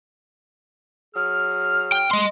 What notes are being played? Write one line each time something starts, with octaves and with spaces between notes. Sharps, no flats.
F#3 G#4 F6
G5
D#5 C6